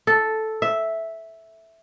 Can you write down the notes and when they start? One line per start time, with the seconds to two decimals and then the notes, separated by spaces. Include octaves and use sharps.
0.07 A4
0.62 E5